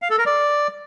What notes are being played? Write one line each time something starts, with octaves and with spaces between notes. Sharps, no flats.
F5
A4
A#4
D5